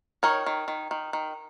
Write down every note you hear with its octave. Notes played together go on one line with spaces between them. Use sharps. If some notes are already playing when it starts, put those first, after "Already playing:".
D#3 A#4 C#5
D#3
D#3
D#3
D#3